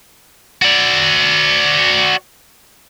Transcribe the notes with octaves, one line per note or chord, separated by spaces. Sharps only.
F#4 D5